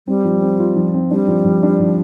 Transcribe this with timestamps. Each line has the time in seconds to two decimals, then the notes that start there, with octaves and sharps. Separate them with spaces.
0.07 G3 C4
0.25 F3
0.41 C4
0.59 F4
0.76 F3
0.94 C4
1.11 G3 D4
1.28 F3
1.45 F3
1.63 D4
1.80 F3